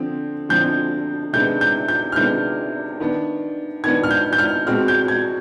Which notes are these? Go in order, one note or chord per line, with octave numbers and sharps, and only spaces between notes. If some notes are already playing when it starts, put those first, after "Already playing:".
Already playing: D3 F3 C4
D3 F3 C4 G6
C3 D#3 G#3 B3 D4 G6
G6
G6
F6
C3 D#3 G#3 B3 D4 G6
D#3 B3 D4
D#3 B3 D4 G#6
F6
G6
G6
F6
B2 G#3 C4 F6
G6
G#6